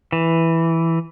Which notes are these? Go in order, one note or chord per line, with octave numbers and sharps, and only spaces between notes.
E3